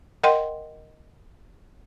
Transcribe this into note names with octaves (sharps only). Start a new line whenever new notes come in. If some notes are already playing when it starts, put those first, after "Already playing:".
A#4 D#5 F#5 G5 C6